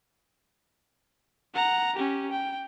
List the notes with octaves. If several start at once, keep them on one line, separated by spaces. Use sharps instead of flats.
F#5 A#5
C#4 G4
G5